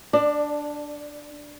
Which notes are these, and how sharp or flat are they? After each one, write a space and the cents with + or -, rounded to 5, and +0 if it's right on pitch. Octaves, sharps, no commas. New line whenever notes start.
D4 +0 D5 +20